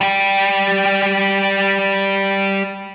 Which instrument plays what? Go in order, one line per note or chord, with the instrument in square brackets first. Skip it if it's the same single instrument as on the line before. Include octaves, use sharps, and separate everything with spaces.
[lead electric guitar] G3 G4